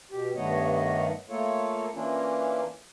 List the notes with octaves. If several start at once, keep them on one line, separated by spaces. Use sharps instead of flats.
B2 G4
G2 D#3 A3 B3 C#5 D#5
A3 A#3 F4 A4 C#5
E3 A#3 C#4 D4 E4 F4